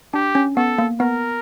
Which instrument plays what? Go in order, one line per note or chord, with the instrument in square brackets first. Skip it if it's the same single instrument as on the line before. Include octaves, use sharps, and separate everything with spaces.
[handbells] D4 [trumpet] G4
[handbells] C#4
[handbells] B3 [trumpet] A4
[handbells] A#3
[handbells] B3 [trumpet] A#4